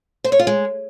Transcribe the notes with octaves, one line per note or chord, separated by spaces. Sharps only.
C5
C#5
F4
G#3